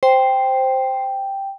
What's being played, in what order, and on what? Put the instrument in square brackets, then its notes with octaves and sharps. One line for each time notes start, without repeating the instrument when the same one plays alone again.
[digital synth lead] C5 [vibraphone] G5